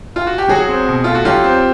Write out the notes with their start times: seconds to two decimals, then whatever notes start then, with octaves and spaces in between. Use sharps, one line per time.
0.16 F4
0.27 F#4
0.38 G4
0.49 F#3 F#4 G#4
0.69 C4
0.87 B2
1.04 A3 F4
1.15 F#4
1.25 F#3 F4 G4
1.44 C4